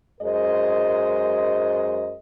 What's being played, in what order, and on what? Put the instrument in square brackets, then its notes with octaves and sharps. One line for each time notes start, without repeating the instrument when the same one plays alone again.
[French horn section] F#2 G#3 A#4 C5 D#5